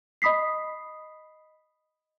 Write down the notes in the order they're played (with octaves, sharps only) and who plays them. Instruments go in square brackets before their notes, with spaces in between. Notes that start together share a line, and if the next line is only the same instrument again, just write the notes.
[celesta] D#5 B5 D#6 B6 C7